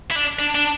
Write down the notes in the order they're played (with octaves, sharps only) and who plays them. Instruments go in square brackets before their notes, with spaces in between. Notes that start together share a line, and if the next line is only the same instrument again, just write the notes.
[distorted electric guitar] E4
D4
D4
D4